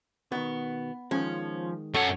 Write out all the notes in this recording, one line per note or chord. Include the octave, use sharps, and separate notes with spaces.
B2 D#3 B3
D#3 F3 G#3 C#4
F#2 A4 C#5 F#5